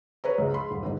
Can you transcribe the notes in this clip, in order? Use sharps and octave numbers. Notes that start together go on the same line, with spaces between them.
B4 C#5 A#5
C#2
B5 C6
D#1
G1 G#2